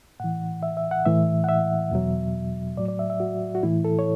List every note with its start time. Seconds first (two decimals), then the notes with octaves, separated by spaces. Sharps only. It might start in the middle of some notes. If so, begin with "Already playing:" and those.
0.20 A2 E3 F#5
0.63 E5
0.77 E5
0.91 F#5
1.06 A2 E3 E5
1.44 F#5
1.49 E5
1.91 E2 B2 F#3
2.77 A2 F#3 D5
2.88 D5
2.99 E5
3.10 E5
3.20 F#4
3.55 F#4
3.63 A2 E3 E4
3.85 A4
3.99 C#5